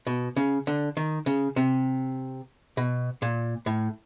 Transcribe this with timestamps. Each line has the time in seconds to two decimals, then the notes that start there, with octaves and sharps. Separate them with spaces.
0.07 B2
0.36 C#3
0.67 D3
0.97 D#3
1.26 C#3
1.56 C3
2.77 B2
3.22 A#2
3.66 A2